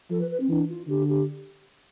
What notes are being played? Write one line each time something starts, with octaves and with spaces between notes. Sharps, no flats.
F3 A4
B4
B4
C4
E3 D4
F4
D3 G4
G4